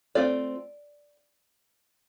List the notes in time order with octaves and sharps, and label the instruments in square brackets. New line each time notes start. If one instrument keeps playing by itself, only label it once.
[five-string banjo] A3 C4 F4 D5